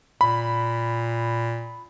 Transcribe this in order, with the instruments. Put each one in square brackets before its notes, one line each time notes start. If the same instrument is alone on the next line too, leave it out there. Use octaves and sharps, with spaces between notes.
[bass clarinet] A#2 [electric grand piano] B5